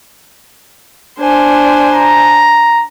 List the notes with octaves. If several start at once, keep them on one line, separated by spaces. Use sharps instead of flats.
D4 C5 G#5
A#5